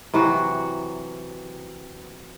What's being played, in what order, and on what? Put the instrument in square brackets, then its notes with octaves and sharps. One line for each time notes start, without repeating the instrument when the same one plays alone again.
[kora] C3 E3 F#3 F#4